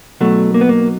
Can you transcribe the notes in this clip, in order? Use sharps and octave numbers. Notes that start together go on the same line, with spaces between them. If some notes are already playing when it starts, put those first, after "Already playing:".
B1 B2 F#3 A3
A#3
B3
A#3